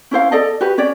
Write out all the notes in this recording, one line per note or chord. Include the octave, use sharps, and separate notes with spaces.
C#4 E4 C5 F5
A4 D5 D#5 A5
F#4 G4 B4
C#4 C#5 D5